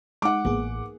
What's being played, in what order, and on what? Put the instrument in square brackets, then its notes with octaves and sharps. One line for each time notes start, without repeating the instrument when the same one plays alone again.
[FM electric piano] G#3 D#4 [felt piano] F#5 D6
[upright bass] A1 [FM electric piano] A#3 B3 G#4